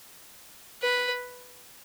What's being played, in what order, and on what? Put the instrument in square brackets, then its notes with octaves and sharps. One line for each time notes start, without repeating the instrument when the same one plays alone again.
[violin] B4